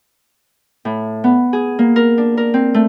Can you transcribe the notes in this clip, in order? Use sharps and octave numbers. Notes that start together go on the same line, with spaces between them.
A2
B3
G#4
A#3
A#4
D4
A#4
C4
A3